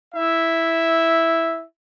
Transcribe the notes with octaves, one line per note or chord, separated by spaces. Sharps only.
E4 E5